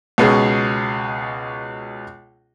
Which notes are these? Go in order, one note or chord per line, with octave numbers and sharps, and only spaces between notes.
C#2 B2 C#4 G#4